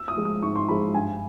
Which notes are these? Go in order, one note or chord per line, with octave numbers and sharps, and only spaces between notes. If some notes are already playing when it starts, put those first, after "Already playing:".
Already playing: E6
D#6
F3 G#3
D#6
G#2 C#6
C6
F3 G#3 B5
G2 G#5